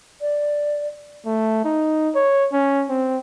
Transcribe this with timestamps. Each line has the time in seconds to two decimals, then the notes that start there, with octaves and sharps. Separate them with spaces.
0.21 D5
1.26 A3
1.64 D#4
2.15 C#5
2.52 C#4
2.89 C4